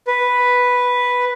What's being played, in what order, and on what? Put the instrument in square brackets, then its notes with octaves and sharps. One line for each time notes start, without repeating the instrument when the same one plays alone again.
[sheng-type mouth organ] B4